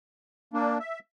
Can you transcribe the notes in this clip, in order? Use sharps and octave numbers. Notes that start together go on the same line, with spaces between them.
A#3 D4
E5